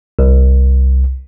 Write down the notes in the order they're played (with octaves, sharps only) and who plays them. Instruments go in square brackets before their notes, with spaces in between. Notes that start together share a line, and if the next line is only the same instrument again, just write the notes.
[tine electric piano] C2